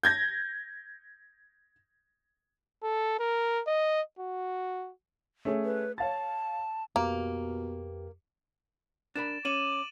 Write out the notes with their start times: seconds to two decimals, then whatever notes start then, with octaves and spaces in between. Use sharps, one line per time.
0.03 G6 G#6 A#6
2.83 A4
3.19 A#4
3.67 D#5
4.19 F#4
5.45 A3 C#4 G#4
5.65 B4
5.98 C#5 F5 A5 A6
6.96 F2 B2 A#3 G4 B4
9.15 D4 A#4 B5 A6 D7 E7
9.45 C#4 C#5 D6 D#7 E7 F#7